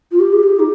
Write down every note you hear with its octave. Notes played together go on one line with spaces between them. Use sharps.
F4
G4
G#4
G4
D#4